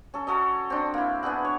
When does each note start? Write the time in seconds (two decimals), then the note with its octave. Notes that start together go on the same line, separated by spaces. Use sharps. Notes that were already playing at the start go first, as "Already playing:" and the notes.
0.14 C#4 A4
0.27 F#4 A4 C#5 D#5
0.70 C4 D4
0.94 A#3 E4
1.23 B3 D4 G#4 F#5
1.45 C#5